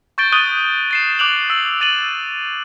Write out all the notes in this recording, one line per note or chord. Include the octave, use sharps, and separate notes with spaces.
C#6 G6 A6 D7 G7
C#6 D#6 F#6 A6 D#7 G7
A6 C7 E7
D6 F#6 D7 F7 F#7
E6 C7 F#7
E6 A6 D#7 E7 F#7